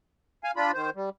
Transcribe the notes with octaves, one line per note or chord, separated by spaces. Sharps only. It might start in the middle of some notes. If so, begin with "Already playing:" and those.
F5 G#5
D4 F4 B5
D#3 C5
G3